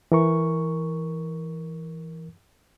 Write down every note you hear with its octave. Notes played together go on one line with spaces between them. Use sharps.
E3 A#4 C#6